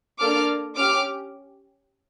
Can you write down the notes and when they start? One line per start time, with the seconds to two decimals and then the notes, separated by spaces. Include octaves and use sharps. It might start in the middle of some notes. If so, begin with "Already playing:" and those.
0.20 A#3 D4 A4 D6 F6
0.76 C#4 G4 D6 F6